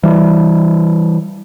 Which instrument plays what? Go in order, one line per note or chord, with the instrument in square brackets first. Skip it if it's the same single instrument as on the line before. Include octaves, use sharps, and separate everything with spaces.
[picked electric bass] E3 G3